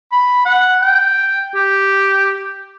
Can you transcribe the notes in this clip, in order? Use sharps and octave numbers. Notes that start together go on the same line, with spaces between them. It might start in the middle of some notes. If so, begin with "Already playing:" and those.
B5
F#5
G5
G4